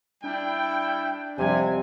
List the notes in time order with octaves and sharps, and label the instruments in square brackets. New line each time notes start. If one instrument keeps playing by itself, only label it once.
[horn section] G3 E4 G5 [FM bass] D4
[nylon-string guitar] F2 G3 [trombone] C3 [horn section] G#5